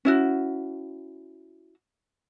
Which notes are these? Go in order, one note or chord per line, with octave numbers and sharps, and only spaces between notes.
C#4 E4 F#4